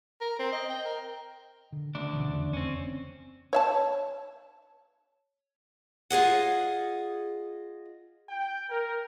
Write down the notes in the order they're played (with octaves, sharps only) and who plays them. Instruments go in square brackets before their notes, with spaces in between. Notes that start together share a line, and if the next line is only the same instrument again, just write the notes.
[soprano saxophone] A#4
C4
D#5
G5
A#4
[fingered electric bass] D3
[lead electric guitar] D2 D4 [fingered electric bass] C#3
[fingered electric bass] C2 B2 E3
F1 E2 C#3
[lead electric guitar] C4 C#4
[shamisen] C#5 E5 A5
[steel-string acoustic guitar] F4 G#4 D#5 F#5
[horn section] G5
A#4